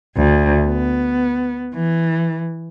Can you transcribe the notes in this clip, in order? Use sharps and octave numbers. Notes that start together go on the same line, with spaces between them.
D2
B3
E3